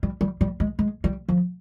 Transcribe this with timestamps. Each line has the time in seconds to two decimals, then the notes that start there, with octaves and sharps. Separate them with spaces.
0.03 G3
0.21 G3
0.41 G3
0.60 G#3
0.79 G#3
1.04 G3
1.29 F3